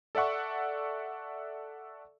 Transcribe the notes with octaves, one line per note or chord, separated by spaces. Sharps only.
A4 D5 E5 F#5 C#6